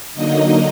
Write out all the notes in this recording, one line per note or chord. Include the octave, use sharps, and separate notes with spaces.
D3 F#3 A#3 D#4 D#5